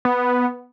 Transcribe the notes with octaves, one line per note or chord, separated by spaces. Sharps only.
B3